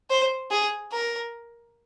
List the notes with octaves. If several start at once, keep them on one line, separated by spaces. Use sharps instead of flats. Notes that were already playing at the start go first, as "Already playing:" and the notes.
C5
G#4
A#4